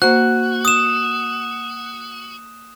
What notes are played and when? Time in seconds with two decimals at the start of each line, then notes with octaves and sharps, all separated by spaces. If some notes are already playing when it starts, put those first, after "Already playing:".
0.02 A#3 F#4 C5 F#6
0.65 D#6 E7